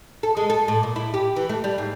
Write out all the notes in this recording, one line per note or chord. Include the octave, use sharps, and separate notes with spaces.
A4
G#3
A4
A2
A#2
E4
G4
E3
A3
G3
G#2